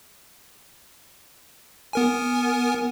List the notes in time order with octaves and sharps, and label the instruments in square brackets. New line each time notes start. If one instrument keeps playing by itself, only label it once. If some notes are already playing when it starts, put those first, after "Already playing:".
[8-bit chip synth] B3 A#4 G#5